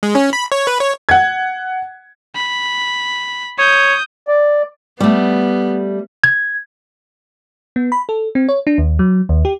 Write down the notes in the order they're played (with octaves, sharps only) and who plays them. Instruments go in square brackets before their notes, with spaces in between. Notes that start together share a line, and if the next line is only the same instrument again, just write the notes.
[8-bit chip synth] G#3
C#4
B5
C#5
B4
C#5
[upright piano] F#5 G#6
[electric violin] B5
[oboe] C#5 [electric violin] D#6 G6
[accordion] D5
[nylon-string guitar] G3 A3 [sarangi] B3
[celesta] G#6
[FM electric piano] B3
B5
A4
C4
C#5
D4
D#2
F#3
D#2
G4